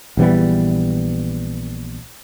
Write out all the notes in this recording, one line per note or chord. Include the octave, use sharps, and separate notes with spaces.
A#1 E3 G3 B3